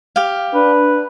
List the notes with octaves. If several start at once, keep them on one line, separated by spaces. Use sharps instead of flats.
G4 F5
D4 B4